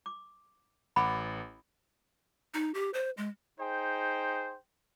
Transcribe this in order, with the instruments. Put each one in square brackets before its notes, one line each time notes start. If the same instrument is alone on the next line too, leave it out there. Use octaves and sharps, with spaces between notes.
[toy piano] D6
[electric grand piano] A1 F#5 D6 [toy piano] B5
[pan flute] D#4
G4
C5
G#3
[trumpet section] D#4 G#4 C5 G5